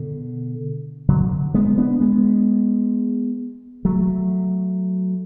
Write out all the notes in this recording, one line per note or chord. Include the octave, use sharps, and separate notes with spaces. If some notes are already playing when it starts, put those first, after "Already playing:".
Already playing: B2 D3
D3 F#3
G#3 B3
B3 D4
G#3 B3
F#3 A3